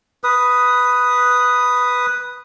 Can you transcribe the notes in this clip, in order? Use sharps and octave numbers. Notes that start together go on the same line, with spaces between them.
B4 D#6